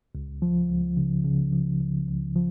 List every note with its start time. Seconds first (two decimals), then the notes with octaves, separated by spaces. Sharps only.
0.15 C#2
0.42 F3
0.69 C#2
0.97 C#3
1.24 C#3
1.53 F3
1.80 C#2
2.07 C#2
2.36 F3